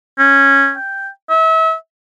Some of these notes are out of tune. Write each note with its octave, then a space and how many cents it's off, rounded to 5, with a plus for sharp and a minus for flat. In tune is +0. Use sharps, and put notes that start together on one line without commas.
C#4 -10
G5 +0
E5 -35